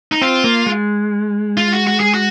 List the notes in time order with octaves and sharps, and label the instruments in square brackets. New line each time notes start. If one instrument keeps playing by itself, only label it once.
[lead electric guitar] D#4
[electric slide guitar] C4 [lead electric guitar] F4
[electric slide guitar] A#3
G#3
[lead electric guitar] F4
F#4
F#4
G#4
F#4